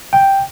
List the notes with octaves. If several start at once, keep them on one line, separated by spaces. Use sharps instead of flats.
G5